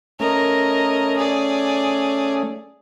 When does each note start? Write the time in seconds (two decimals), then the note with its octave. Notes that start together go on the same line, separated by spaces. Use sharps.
0.20 A3 C#4 A#4 D#5
1.18 G#4 D5